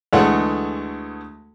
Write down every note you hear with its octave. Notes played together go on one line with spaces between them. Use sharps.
D2 E3 G#3 A3 G#4 F#5